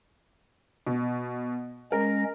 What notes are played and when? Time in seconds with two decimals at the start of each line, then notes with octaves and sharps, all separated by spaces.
0.87 B2
1.92 G#3 C#4 A#4 A#6